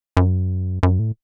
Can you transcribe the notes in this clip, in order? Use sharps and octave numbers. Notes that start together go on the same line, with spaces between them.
F#2
F#2
A2